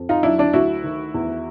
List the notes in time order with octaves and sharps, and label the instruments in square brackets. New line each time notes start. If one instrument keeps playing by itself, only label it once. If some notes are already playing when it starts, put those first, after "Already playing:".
Already playing: [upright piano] F2
D#4 F4
F#3 D4 E4
D4 E4
D2 E4 F#4
D#3
E2